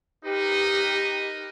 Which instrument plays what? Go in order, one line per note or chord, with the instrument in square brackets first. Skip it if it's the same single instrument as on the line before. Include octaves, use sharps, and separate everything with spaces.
[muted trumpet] D#4 [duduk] G4 [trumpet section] A#4 B4 D#5